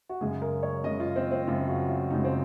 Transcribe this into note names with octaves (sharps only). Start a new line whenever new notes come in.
F#4
F#2 C#3 G#3 G#4
A#4
C#5
F#2 C#3 G#3 D#5
F4
C4
C4
F#2 C#3 G#3 F4
F#4
F4
F#2 C#3 G#3 D#4
C4